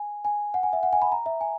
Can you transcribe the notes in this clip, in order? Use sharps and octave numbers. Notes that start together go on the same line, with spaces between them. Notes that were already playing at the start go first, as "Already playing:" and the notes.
Already playing: G#5
G#5
F#5
G#5
E5
F#5
G#5
B5
A#5
E5
G#5